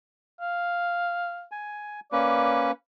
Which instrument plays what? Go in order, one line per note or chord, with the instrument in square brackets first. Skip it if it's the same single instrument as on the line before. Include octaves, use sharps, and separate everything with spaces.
[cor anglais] F5
[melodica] G#5
[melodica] A#3 C#4 B4 [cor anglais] D5